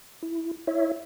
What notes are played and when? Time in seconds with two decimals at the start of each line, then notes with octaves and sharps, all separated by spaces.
0.23 E4
0.67 E4 C#5 E5